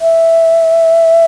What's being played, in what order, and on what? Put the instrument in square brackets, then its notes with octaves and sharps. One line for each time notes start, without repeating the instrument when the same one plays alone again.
[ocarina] E5